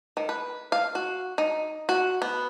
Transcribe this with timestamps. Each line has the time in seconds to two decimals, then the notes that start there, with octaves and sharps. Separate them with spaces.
0.17 D#3
0.29 B4
0.72 F5
0.95 F#4
1.38 D#4
1.89 F#4
2.22 B3